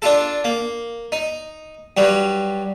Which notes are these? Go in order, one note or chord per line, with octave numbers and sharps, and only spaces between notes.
D4 F4 A4
A#3
D#4
G2 F#3 G3